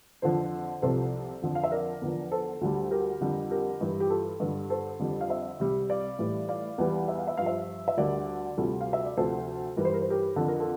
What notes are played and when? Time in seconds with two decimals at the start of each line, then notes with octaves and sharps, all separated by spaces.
0.22 F2 D3 F3 A4 C5
0.82 C2 C3 F3 A4 C5
1.42 F2 D3 F3
1.55 F5
1.64 E5
1.72 A#4 D5
2.02 E2 D3 F3
2.31 A4 C5
2.61 D2 D3 G3
2.91 G4 A#4
3.20 F2 D3 G3
3.51 G4 A#4
3.81 G2 E3 G3
4.00 G4
4.10 F4 A4
4.40 G2 D3 G3
4.70 A4 C5
4.99 F2 D3 G3
5.21 F5
5.30 C5 E5
5.60 C2 C3 G3
5.89 D5 F5
6.19 A2 E3 G3
6.49 D5 F5
6.78 E2 E3 G3
7.08 E5
7.18 F5
7.27 E5
7.37 G2 F3 F5
7.46 C5 E5
7.88 E5
7.97 D2 D3 G3 A#4 D5
8.57 D2 C3 G3 F4 A4
8.81 F5
8.93 E5
9.05 D5
9.17 D2 C3 F3 A4 C5
9.77 G2 E3 G3 A#4
9.85 C5
9.94 A#4
10.02 C5
10.10 G4 A#4
10.36 F2 D3 F3 A4
10.48 A#4
10.60 F4 A4